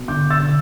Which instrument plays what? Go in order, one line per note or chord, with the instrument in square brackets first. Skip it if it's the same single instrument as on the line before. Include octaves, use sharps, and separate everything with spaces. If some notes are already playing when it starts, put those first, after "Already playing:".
Already playing: [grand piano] B2
D3 D6 G6
E6 A6
D3